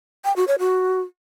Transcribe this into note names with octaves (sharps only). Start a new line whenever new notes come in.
G5
F#4
C#5
F#4